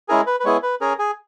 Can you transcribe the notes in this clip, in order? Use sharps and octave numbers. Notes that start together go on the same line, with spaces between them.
G#3 C#4 E4 G#4 A#4
B4
B4
G#3 B3 E4 G#4 C#5
B4
C#4 G#4 A#4
G#4